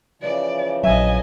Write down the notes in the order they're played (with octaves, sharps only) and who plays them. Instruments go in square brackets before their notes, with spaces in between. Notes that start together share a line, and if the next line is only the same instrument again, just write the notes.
[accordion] C#3 E3 F3 [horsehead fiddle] D5
[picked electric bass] A#1 F#3 [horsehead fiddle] D#5 G#5 [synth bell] E5